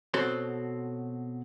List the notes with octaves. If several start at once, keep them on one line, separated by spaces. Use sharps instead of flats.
B2 C4 F#4 A4 C#5 C6